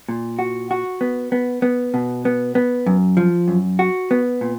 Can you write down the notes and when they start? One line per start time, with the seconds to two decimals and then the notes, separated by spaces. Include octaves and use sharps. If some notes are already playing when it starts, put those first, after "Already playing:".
0.09 A#2
0.39 F#4
0.71 F#4
1.01 B3
1.32 B3
1.62 B3
1.94 B2
2.25 B3
2.55 B3
2.86 F#2
3.17 F3
3.48 F#2
3.79 F#4
4.11 B3
4.41 A#2